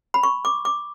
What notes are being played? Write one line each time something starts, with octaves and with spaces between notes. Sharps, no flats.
B5
C#6
D6
D6